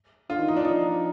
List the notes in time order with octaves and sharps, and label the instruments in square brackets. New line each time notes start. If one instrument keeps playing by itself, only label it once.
[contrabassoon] D3 [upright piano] F4
[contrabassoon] D#3
[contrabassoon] E3 [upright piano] D#4
[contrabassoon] F3 [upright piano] D4
[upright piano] D#4